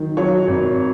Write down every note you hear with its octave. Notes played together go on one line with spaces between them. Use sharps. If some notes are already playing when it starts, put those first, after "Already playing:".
Already playing: D#3 F#3
F#3 C#5
G#1